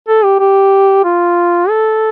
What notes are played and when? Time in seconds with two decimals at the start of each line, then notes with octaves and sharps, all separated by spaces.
0.08 A4
0.24 G4
0.40 G4
1.05 F4
1.69 A4